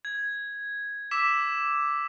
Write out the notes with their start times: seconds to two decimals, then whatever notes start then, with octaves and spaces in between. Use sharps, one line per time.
0.05 G#6
1.11 D6 E6 B6 E7